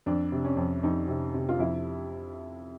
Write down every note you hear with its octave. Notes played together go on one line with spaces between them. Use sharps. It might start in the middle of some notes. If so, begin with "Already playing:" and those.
F2 D4
C3
C#4
F2
F2 D#4
C3
C3
F4
F2 E4